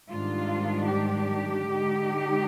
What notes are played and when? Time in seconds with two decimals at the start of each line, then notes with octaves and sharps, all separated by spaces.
0.11 G#2 D#3 G3 D4 F4
0.90 G4
1.69 D3 G#3 D#4